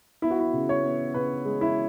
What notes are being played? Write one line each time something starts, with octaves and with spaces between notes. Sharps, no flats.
B3 E4
F#4
E4
C#3
C#5
B3
C#3 B4
G#3
E4